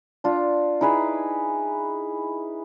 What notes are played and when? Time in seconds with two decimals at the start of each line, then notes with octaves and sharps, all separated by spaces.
0.24 D4 F4
0.81 D#4 E4 G#4 B4